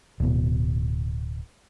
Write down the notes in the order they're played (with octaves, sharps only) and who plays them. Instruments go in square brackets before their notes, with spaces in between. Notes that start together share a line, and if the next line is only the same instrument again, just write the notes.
[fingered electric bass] D1 B2